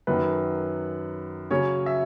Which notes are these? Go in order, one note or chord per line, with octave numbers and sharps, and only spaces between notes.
F#2 D#3 F#3 B4
C#3 F#3 C#4 C#5
E5